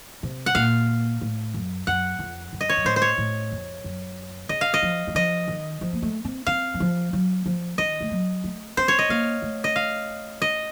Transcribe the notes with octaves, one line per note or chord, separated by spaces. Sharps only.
C3
F#5
A#2 F5
A2
F#2
F#2 F#5
F2
F#2
D#5
C#5
F#2
A2 C5
C5
C#5
A2
F2
F#2
C#3 D#5
F5
D#5
F3
F#3
F3 D#5
D#3
F3
A#3
A3
C4
C4 F5
F#3
F3
F#3
F3
D#3 D#5
A3
F#3
A3
C4 C5
C#5
D#5
A#3 F5
A3
D#5
F5
D#5